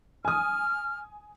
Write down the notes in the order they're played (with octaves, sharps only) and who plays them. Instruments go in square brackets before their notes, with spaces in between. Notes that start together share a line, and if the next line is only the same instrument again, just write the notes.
[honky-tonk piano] G#5 D#6 [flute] F6